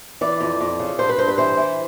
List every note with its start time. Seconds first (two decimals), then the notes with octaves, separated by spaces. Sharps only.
0.21 E3 D5
0.41 F2
0.61 F2
0.79 C#3
0.99 G2 C5
1.09 B4
1.18 G2 C5
1.28 B4
1.38 E3 C5
1.57 E3